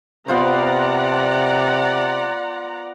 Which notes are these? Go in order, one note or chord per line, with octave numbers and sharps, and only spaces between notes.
C3 B3 F4 C5 D5 F#5 A#5